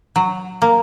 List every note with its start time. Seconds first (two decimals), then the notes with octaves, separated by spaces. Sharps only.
0.16 F#3
0.62 A#3